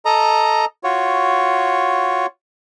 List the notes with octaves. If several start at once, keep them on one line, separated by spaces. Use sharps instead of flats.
A4 D#5 A#5
F4 F#4 C#5